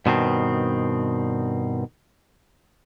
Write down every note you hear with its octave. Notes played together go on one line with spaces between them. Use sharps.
G2 B2 D#3 C4